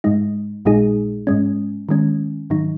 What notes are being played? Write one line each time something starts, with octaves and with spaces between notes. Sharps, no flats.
G#2 G#3 D#4
A#1 A#2 G#3 D#4 G#4
G#2 G#3 C#4
D#3 G#3 C#4
G#2 D#3 F#3 D#4